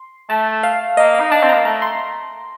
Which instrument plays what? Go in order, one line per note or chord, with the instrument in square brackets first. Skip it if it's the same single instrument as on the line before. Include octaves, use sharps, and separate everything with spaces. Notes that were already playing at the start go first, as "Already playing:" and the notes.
Already playing: [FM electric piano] C6
[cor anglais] A3 [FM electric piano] A5
[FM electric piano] F5
[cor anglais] A#3 [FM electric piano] D#5
[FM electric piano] F5
[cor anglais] D#4
[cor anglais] D4 [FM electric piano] A5
[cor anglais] C4
[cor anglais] A#3 [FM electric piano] A#5
[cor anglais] A3 [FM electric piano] A#5
[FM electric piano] C6